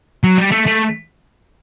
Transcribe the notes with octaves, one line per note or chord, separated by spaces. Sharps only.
F#3
G3
A3
A3